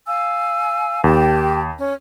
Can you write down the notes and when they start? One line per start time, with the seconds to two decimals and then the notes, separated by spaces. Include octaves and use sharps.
0.06 F5 G#5 E6
1.04 D#2 G4 G5 A5
1.78 C#4